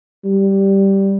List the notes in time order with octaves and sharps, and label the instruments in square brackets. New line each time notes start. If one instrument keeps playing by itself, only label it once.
[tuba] G3